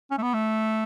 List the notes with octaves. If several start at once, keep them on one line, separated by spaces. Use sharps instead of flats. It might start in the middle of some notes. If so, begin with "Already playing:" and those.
C#4
A3
B3
A3